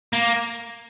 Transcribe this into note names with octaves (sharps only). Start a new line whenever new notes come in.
A#3